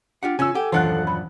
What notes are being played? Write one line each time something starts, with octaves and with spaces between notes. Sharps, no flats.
D4 F4 G4 F#5
C#3 C#4 F4 G#5 E6
G4 A4 F#5
D#1 F#2 E3 D4 F4 F#5 F#6
B5